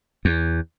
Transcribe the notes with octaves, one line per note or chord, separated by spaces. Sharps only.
E2